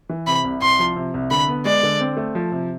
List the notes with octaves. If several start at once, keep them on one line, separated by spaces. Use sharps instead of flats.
E3
C3 B5
C2
C2 C6
F3
C3
C2
D3 B5
B3
G#3 D5
D3
C4
A3
F3
C3